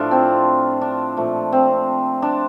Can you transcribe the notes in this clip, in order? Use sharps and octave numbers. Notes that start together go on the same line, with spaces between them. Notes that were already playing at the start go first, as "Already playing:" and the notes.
Already playing: A2 F3 A3 D4 F4
C4
D4
A#2 F3 A3
C4
D4